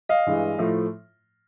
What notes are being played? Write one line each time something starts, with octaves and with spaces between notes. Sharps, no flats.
D#5 F5
G2 E3 G#3
A2 F3 A3